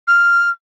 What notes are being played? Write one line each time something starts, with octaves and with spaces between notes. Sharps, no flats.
F6